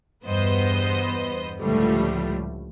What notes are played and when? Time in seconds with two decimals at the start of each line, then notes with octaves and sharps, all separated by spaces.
0.23 E2 G2 B3 C5 D#5
1.59 C#2 A2 D3 F3 G3 A3